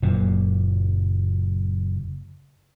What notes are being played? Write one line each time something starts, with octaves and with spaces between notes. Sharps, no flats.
F#1 F#2 A#2